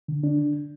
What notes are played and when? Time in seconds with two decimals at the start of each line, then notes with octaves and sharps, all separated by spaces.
0.08 D3
0.23 D4